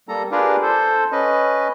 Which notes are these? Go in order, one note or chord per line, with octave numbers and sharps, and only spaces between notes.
G3 A#3 A4 A#5
D4 F4 G4 G#4 A#4 B4
A4 C5
C#4 B4 D#5